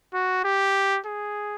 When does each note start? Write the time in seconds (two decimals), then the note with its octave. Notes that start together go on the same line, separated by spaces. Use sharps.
0.14 F#4
0.44 G4
1.06 G#4